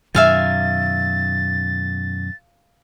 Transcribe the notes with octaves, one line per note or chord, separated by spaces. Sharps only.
F#2 B2 D#3 E5 F5 G#5 A6